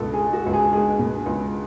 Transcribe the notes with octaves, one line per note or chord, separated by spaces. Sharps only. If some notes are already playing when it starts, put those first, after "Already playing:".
Already playing: C#2 B2 A4
G#4
G#3
F#4
C#2
G#4
G#3 G#4
B2
C#2